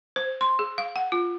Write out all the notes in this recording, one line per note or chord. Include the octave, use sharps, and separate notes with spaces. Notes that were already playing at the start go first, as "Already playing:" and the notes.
C5
C6
G#4
F5
F#5
F4